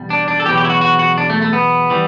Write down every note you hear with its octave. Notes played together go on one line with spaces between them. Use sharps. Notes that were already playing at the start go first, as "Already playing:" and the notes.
Already playing: E2 B2 G3
D4
D4
A4
E2 B2 F#3 G4
G4
E4
F#4
F#4
F#4
D4
A3
A3
B3
E3 G3